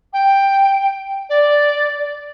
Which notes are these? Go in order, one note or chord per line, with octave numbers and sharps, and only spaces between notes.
G5
D5